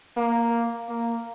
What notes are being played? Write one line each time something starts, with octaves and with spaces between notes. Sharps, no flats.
A#3
A#3